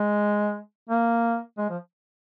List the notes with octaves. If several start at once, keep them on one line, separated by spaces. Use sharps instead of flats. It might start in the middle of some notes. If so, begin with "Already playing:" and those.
Already playing: G#3
A#3
G#3
F3